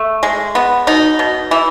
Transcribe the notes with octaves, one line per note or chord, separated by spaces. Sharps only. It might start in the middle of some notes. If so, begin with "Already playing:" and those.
Already playing: A3
G#3
B3
B2 D#4
B2
E3